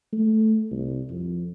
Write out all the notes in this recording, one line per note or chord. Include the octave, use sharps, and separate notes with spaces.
A3
C2
F2